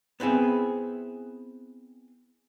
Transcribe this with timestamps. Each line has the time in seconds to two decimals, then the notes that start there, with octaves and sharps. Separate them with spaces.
0.20 B3 C4 E4 G#4